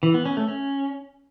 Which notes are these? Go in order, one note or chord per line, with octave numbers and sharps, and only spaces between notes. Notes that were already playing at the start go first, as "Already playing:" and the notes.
E3
B3
C#4
A3
C#4